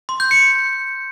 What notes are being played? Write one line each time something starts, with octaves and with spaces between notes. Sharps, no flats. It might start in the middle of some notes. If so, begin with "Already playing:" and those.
C6
G6
C#7